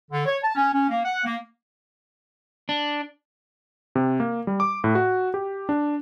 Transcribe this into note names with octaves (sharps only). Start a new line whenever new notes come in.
D3
C#5
A5
C#4
C#4
A#3
F#5
A#3
D4
C3
A#3
G3
D6
A2
F#4
G4
D4